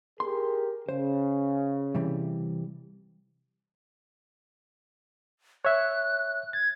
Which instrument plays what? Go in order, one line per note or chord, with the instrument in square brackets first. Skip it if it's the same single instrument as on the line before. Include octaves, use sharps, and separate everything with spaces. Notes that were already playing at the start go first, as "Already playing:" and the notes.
[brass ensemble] G4 G#4 A#4 [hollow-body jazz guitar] C6
[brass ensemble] C#3 [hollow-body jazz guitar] C5
[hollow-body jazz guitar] C3 E3 G3
[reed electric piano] C#5 E5 [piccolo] F#6
[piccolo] G#6 [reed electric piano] A6